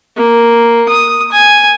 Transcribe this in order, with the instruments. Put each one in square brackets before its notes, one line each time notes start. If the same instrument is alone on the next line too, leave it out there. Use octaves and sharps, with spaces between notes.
[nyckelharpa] A#3
D#6
G#5